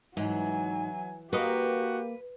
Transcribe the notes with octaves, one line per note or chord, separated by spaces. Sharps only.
G#2 E3 F#3 G#5
A#3 F#4 G4 A#4 B4 D#5